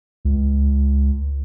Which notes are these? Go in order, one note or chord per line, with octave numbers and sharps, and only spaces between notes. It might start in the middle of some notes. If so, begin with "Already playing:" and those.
C#2